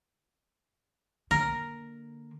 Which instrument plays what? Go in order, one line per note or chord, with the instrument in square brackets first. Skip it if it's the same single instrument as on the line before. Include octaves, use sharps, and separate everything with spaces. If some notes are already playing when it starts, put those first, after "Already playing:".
[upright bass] D3 A#3 [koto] A#4